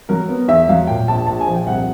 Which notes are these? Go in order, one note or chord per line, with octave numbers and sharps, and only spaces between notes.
F#3 A#4
B3
E2 E5
F#3 F5
A#2 G5
A#1 A5
A#1 A5
G#5
F3
G5
C2 F#5